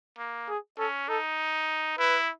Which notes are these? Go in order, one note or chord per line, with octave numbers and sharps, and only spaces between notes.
A#3
G#4
C#4 A4
D#4 A4
E4 B4